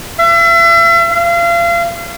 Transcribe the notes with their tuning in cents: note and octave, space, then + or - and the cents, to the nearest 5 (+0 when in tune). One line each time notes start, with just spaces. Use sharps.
E5 +40
F5 -35